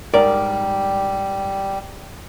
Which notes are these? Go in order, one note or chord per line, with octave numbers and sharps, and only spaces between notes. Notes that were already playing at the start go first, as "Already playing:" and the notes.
G#2 G3 A#4 D5